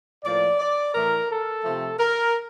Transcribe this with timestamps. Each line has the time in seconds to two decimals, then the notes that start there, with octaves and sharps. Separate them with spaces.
0.24 A2 F3 A#3 D5
0.59 D5
0.94 A2 E3 A3 A#4
1.29 A4
1.64 C3 F3 A3
1.99 A#4